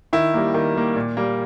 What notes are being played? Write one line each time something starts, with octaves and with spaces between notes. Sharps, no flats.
D#3 E4
G3 A#3
D#3
G3 A#3
A#2
G3 A#3